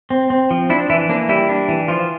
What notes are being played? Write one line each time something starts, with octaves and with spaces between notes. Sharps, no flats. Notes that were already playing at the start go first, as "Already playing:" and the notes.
C4
C4
F3
D4 E4
E3 E4
A#3 D4
G3 E4
D4
E3
F3 F4